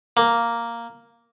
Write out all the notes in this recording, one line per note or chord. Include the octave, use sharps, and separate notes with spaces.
A#3